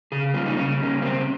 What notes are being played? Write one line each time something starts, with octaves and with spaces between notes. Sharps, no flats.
C#3 G#4
G3 A#3 F4
D#4
C#3 C#4
G3 A#3
C#3 C4